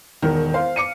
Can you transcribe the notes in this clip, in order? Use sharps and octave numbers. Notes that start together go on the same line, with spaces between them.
E1 D#3 A#4
C5 F5
D6 C#7 D#7